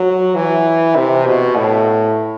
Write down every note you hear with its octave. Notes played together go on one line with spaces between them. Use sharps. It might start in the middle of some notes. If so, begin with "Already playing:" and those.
Already playing: F#3
E3
C3
B2
A2